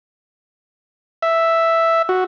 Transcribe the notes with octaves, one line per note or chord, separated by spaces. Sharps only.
E5
F#4